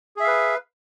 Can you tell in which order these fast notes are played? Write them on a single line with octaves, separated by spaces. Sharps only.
G#4 E5 F5 B4